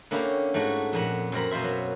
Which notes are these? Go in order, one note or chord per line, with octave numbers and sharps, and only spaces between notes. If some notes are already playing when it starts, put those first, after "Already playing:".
D3 A#3 C#4 E4 G4
G#2 A3 F#4
F2 A#2 F#5
F#2 C4 A#4 B5
B2 A#3 C5 E5
F#3